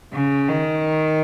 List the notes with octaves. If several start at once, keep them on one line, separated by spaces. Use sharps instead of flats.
C#3
D#3